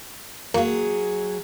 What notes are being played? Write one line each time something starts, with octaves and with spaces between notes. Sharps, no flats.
F#3 A#3 G#4